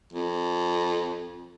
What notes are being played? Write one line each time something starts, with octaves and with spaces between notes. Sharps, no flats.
F2